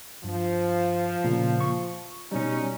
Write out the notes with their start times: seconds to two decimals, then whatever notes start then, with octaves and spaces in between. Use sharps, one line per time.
0.24 G2 F3
1.24 A#2 C#3 A#3
1.61 C#6
2.32 B2 G3 C#4 D#4